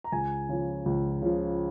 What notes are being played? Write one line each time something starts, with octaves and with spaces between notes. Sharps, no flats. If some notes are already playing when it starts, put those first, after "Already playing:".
A#5
C#2 G#5
C#3 F3
C#2
C#3 F3